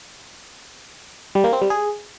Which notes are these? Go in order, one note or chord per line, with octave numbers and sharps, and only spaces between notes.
G3
A#3
C4
G3
G#4